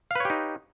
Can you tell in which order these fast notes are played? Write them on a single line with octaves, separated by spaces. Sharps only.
F5 B4 C#5 G4 D#4